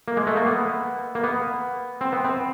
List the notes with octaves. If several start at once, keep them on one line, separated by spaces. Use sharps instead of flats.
A#3
G#3
A3
A#3
B3
A#3
B3
C4
B3
C4